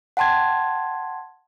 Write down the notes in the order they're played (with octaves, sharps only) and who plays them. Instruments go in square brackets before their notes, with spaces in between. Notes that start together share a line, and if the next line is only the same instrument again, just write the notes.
[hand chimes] F#5 G5 A5 C6 G#6